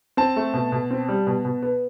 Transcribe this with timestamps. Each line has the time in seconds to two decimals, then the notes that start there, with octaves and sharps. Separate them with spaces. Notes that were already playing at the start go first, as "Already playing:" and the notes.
0.17 C4 A5
0.36 A3
0.54 B2
0.72 B2
0.91 C4
1.08 G3
1.27 B2
1.45 B2
1.63 B3